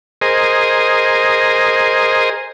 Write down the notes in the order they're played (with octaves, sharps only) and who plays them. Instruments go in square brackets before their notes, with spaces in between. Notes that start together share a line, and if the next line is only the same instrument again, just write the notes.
[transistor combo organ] G#4 A#4 C5 D#5